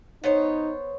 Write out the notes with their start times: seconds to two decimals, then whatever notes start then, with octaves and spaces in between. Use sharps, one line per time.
0.24 B3 D#4 C5 C#5